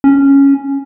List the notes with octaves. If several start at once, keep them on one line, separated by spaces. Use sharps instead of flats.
C#4